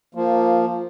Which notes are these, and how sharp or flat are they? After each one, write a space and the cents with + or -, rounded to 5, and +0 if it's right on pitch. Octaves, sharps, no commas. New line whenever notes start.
F3 +0 A#3 -15